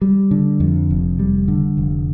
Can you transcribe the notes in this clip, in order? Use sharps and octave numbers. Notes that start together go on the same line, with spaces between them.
G3
D3
F2
F1
G3
D3
F1